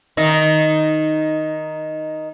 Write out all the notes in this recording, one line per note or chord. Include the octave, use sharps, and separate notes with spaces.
D#3 D#4